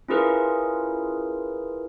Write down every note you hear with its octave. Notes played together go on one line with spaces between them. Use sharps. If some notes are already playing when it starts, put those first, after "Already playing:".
C#4 E4 F4 G#4 A#4 B4